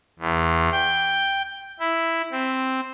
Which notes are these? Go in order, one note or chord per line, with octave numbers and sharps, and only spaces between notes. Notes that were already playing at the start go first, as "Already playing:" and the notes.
E2
G5
E4
C4